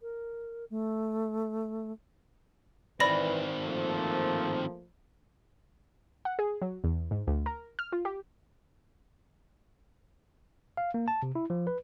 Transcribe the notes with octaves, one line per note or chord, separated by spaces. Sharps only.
A#4
A3
D#3 E3 C4 B4 D5 B5 A#6
F3 A3 A#3
F#5
G#4
F#3
E2
G#2
D2
A#4
F6
F4
G4
F5
A#3
A5
C3
E4
F3
B4